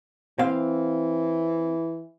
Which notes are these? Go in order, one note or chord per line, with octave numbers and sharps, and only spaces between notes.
E3 C4 F5